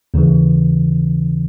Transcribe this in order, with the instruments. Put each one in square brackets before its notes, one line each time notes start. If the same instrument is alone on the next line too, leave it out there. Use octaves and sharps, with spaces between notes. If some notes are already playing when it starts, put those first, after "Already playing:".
[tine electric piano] D#2 C#3 E3